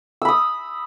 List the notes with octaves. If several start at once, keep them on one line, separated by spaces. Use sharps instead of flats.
B5 D#6 E6